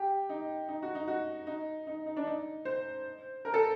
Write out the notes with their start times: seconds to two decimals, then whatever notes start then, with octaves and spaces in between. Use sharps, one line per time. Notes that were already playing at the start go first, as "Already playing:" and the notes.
Already playing: G4
0.29 D#4
0.69 D#4
0.83 F#4
0.95 D#4
1.08 F#4
1.47 D#4
1.87 D#4
2.06 D#4
2.17 D4
2.27 D#4
2.65 C5
3.45 A#4
3.54 A4